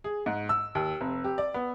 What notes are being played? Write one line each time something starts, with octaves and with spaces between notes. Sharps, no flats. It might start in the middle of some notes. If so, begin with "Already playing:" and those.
G#4
G#2
E6
D#2
F1
G4
D5
B3